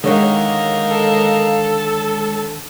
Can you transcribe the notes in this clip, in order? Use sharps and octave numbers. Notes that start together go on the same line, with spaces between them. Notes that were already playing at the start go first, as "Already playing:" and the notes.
D3 D#3 G#3 A#4 C#5 D#5 F5
A4